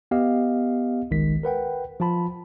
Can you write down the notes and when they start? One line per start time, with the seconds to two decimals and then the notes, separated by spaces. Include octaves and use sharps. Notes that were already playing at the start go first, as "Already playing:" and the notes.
0.11 B3 G4 D#5 F5
1.11 G1 C2 D#3 G#3 B6
1.43 A#4 B4 F#5 G5
2.00 F3 F4 A5 B5